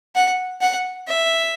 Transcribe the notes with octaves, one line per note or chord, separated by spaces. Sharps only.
F#5
F#5
E5